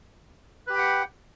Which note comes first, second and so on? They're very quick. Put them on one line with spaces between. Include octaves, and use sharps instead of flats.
B4 G4 B5 G5 F#5